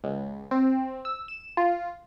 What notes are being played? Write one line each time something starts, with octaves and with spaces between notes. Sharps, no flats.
C#2
C4
E6
E7
F4